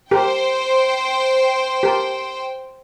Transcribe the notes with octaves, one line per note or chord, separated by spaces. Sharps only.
G4 A#4 C5 G5
G4 A#4 A5